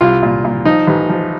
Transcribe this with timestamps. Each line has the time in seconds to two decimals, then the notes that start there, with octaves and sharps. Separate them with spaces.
0.01 C2 F4
0.23 A#2
0.45 A#2
0.65 F3 D#4
0.87 A1
1.09 F3